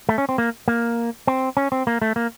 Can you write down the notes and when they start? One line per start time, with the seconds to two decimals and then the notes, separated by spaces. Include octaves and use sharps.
0.09 A3
0.18 C#4
0.29 C4
0.38 A#3
0.68 A#3
1.27 C4
1.57 C#4
1.72 C4
1.87 A#3
2.02 A3
2.16 A#3